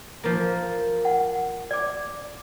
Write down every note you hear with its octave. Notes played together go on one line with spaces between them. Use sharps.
F3 A#3
F#5
D5 D6